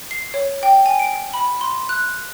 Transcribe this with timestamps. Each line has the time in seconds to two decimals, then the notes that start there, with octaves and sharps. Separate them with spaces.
0.11 C7
0.34 C#5
0.63 G5
0.86 G#5
0.99 D7
1.34 B5
1.61 C6
1.89 F#6